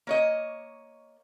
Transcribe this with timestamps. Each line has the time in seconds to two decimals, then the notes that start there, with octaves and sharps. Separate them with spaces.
0.07 A#3 C#5 D#5